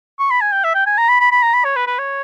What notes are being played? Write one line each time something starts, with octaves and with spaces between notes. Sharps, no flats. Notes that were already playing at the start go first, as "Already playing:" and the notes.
C#6
B5
G#5
G5
E5
G5
G#5
A#5
B5
B5
B5
A#5
B5
C#5
B4
B4
C#5